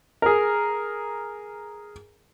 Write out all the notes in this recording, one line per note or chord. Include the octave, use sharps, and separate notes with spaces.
G#4 A#4